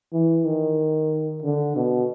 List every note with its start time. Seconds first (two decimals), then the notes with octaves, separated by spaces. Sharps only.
0.13 E3
0.46 D#3
1.43 D3
1.76 B2